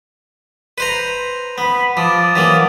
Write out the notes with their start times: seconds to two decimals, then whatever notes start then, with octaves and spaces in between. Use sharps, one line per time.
0.78 B4 C5 A#5
1.58 B3 B5
1.97 F3 A5 D6 D#6
2.36 E3 F#3 A#3